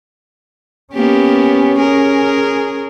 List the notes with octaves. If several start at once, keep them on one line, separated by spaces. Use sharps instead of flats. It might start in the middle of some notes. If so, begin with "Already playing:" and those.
A#3 B3 C#4 G4
G#4 A#4